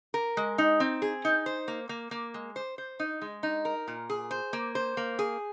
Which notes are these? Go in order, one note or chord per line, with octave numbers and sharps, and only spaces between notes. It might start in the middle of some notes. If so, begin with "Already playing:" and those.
A#4
G#3
D#4
C4
G#4
D#4
C5
A#3
A#3
A#3
G#3
C5
C5
D#4
G#3
D#4
A#4
A#2
G#4
C5
A#3
C5
A#3
G#4